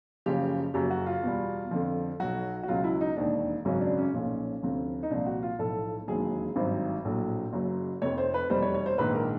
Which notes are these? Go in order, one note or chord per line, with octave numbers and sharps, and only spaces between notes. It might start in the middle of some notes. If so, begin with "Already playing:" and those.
F#1 F#2 C#3 F3 G4
F#1 F#2 C#3 F#3 G4
F#4
F4
E2 B2 G3
F2 D3 F3
B1 B2 F#3 F#4
F#4
C#2 B2 F#3 F4
E4
D#4
E1 D#2 D#3 D4
G#1 F#2 C#3 F#3 C#4
D4
C#4
B1 A#2 F3 C#4
D2 C3 F3
D#4
C2 A#2 F3 D4
F#4
F4
B1 A2 F3 A4
E1 D#2 D#3 F#3 G#4
G#1 G2 D#3 F#3 C5
A#1 A2 F#3
F#1 F#2 C#3 F#3
F1 F2 C3 C#5
C5
B4
F1 E2 B2 G3 C5
C#5
C#5
C5
A#1 G#2 D#3 B4
A#4